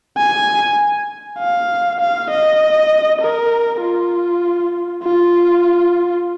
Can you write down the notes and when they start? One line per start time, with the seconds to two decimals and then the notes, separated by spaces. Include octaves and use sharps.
0.17 G#5
1.39 F5
2.00 F5
2.30 D#5
3.22 A#4
3.81 F4
5.03 F4